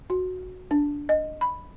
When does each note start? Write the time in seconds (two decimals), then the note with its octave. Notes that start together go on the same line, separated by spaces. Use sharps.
0.10 F#4
0.71 D4
1.09 D#5
1.41 B5